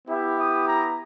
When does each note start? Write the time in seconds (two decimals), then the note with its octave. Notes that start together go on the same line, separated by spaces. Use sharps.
0.08 B3 E4 G4 E5
0.38 D#6
0.65 A#5